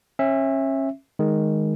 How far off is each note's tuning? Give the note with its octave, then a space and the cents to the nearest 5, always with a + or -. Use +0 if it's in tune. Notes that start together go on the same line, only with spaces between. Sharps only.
C#4 -35 E5 +0
D#3 +0 G#3 +0